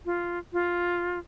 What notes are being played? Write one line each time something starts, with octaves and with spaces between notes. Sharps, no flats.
F4
F4